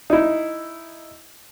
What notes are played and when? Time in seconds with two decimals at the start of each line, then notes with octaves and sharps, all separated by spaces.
0.10 D#4 E4